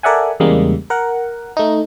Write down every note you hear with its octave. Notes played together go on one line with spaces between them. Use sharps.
A4 A#4 D5 E5 F#5 G#5
E2 C#3 G3 G#3 A#3
A#4 F#5
A3 D#4